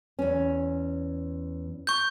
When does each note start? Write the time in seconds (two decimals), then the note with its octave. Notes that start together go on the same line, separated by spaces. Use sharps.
0.19 E2 C#4
1.87 C#6 G6